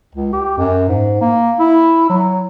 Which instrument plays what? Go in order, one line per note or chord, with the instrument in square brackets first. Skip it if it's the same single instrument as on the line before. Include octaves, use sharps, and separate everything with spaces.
[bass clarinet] C#2
G4
F#2
G#2
A#3
E4
F#3